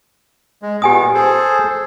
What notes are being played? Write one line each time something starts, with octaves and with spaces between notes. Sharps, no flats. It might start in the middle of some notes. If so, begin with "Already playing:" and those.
G#3
A#2 B3 G4 G#5 D#6
G#4 A4 C5